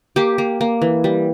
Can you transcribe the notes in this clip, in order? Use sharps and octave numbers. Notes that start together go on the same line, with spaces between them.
A#3 G4
A#3
A#3
E3
G3